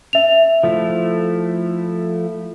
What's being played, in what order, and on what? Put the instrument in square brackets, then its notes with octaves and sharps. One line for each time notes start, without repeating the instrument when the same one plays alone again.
[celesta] E5 F7
[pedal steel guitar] F3 A3 E4